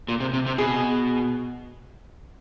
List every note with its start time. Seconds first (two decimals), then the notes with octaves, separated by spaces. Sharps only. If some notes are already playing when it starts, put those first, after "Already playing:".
0.08 A#2
0.20 C3
0.34 C3
0.46 C3
0.58 B2 G#4